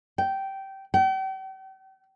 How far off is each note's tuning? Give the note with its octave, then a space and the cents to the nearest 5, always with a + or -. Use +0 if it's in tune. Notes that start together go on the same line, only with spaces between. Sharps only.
G5 -15
G5 -40